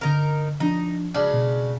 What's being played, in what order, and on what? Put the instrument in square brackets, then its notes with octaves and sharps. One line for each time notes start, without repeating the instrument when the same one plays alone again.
[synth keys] G1 D3 [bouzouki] D#4 A#4
[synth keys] F3 D4 [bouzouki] D#4
[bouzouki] C#3 [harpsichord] G#3 D4 F#4
[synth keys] B2